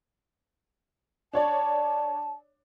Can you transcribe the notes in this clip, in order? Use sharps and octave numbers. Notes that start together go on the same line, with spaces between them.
D4 C#5 D5 A5